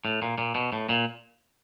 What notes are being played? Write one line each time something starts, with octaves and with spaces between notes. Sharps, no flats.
A2
A#2
A#2
B2
A2
A#2